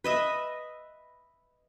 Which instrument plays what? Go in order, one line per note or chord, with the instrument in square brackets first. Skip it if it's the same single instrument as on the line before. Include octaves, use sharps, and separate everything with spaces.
[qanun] B4 D#5 E5